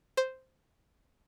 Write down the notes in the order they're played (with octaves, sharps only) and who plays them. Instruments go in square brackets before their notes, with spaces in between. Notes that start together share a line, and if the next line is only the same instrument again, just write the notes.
[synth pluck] C5